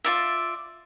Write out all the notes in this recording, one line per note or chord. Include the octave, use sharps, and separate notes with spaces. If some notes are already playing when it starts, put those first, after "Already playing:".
F4 D5 E5